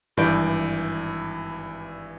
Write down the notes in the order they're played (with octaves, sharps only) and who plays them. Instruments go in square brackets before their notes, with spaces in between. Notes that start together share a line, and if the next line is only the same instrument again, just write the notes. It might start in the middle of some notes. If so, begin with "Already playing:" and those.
[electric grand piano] G#1 G2 E3 D5 G6 D7